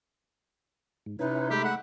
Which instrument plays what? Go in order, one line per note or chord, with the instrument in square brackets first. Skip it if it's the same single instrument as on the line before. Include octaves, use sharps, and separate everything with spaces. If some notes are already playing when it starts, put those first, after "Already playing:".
[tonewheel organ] G#2
[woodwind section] C3 D#4 [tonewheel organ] C#4 E4 [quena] B4
[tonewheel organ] G#3 A3 E5 [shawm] G4 [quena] B5
[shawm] F#5